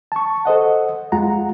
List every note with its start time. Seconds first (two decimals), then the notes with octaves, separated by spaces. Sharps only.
0.12 A5 C#6
0.45 A4 C5 D#5 F#5
1.12 F2 G#3 F4 F#5 A#5